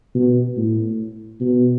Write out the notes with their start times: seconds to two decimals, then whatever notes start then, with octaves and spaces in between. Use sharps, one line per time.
0.15 B2
0.56 A2
1.40 B2